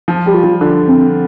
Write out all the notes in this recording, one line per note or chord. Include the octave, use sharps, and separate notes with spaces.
F3
G3 G4
F4
F3
D3 D4
C4